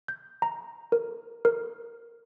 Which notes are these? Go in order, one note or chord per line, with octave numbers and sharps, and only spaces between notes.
G6
A#5
A#4
A#4